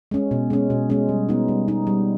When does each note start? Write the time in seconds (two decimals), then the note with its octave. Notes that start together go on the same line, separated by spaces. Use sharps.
0.11 G#3 C#4
0.31 B2
0.50 G#3 C#4
0.70 B2
0.90 G#3 C#4
1.09 G3
1.29 B3 D#4
1.48 G3
1.68 B3 D#4
1.87 G3